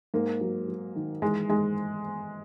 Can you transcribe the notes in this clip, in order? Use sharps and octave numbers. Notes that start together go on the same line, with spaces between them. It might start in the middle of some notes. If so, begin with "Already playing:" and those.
G#2 A#3
F#3
F#3
D#3
E3 G#3
G#2 G#3